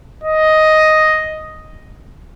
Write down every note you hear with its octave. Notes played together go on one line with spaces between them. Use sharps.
D#5